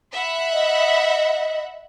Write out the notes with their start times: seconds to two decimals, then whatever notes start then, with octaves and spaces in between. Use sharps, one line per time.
0.12 E5 F#5 B5
0.53 D#5